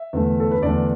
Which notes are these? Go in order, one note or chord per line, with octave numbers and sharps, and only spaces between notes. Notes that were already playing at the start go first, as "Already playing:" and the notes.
Already playing: E5
E2 D3 A3
A4
B4
E2 D3 A3 D5